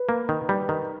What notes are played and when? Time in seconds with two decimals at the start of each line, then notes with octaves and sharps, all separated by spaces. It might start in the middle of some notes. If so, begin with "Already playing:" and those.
Already playing: B4
0.09 A#3
0.29 D#3
0.49 G3
0.69 D#3